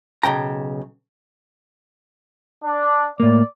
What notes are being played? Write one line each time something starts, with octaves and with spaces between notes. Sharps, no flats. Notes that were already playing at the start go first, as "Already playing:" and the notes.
B1 C#3 G5 A#5
D4
A2 A#3 D5